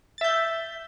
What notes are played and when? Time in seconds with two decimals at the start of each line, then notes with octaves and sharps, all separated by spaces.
0.18 A6
0.21 E5
0.24 G6